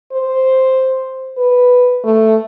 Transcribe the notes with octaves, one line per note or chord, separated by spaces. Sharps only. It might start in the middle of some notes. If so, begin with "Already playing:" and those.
C5
B4
A3